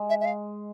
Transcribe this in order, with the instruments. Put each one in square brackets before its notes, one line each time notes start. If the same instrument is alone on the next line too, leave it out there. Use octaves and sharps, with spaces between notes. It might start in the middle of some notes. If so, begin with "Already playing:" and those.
Already playing: [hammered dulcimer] G#3
[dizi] E5
E5
F5